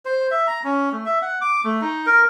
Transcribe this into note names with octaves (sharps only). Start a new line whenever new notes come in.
C5
E5
A#5
C#4
A3
E5
F#5
D6
A3
D#4
A#4